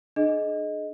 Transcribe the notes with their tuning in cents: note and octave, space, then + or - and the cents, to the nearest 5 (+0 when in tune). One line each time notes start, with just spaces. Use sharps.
D4 +40 G#4 +40 D#5 +0